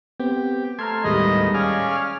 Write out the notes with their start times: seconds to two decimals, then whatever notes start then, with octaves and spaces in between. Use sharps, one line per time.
0.20 B3 C4 G4
0.79 A3 A#5 C6 F6 G#6
1.04 D#2 A2 G3 G#3 B3 D#5
1.54 C#4 G#4 D5 F5